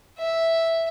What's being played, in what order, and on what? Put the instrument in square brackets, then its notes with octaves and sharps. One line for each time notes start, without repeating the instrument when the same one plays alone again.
[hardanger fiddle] E5